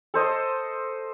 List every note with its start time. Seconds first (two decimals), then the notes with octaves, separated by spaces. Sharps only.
0.14 A4 C5 D#5